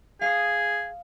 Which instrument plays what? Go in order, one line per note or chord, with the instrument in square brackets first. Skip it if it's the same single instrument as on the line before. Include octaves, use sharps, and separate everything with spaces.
[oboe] G#4 [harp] F5 D#6